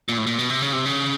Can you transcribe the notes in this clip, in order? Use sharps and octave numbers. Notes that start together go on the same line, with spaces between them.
A#2
A2
A#2
B2
C3
C#3
C3
C#3